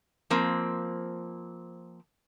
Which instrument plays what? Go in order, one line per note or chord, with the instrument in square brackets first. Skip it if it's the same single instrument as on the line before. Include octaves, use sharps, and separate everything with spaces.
[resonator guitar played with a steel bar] F3 A#3 C4